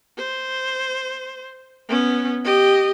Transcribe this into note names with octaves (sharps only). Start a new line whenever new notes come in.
C5
B3 C#4
G4 D#5